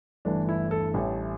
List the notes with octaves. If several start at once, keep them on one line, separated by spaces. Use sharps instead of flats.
G1 G2 E3 A3 D4
E4
A4
A1 A2 G3